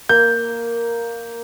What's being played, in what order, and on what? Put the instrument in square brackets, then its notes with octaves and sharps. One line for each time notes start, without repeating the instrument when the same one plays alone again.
[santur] A#3 [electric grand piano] G6